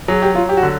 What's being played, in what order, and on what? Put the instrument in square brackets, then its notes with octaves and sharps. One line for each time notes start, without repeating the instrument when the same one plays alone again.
[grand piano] F#3 [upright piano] G#4
[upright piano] G4
[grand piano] F#3 [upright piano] F4
[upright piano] G4
F#4
[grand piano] D3